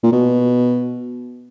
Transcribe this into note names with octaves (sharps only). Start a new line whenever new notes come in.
A#2
B2